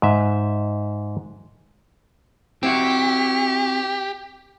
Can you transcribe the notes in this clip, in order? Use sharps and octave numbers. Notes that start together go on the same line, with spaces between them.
G#2 E5
C4 E4 F#4 G4